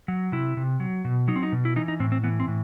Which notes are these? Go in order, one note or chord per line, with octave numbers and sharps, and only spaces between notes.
F#3
C3 E4
C3
F#3
B2
F#3 D#4
C4
D#4
B2
E4
E3 D#4
D#4
A2 C4
C4
E3 B3
C4
A2